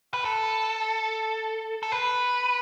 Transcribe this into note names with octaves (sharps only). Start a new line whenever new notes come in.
B4
A4
A4
B4